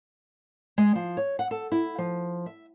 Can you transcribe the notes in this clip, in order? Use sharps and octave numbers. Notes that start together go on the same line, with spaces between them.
G#3
F3
C#5
F#5
A4
E4
F3
E5